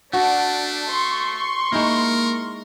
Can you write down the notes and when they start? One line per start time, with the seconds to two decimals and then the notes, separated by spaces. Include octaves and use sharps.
0.13 A3 D4 F#4
0.88 C6 C#6
1.72 G#3 A#3 D#4 E4 A#4